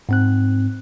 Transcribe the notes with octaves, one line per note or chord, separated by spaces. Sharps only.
G#2 C4 F#6